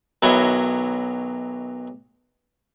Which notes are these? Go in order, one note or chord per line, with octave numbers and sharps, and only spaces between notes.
B1 D#3 F#3 E4 C#5 D#5